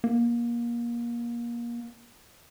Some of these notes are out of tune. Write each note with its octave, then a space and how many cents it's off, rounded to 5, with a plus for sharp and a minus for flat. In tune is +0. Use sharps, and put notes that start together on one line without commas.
A#3 +25